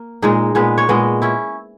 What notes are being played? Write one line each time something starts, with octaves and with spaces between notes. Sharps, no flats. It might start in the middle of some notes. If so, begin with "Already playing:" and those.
Already playing: A#3
A#2 G#3 D#4 G#4
A#2 G#3 B3 B4
C#5
A#2 G#3 B3 D#5
C#4 E4